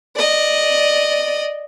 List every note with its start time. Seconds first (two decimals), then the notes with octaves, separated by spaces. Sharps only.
0.16 D5 D#5